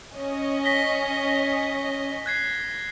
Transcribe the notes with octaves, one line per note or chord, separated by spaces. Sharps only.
C#4 D#5
A#6 B6 G7
F#6 G#6 C7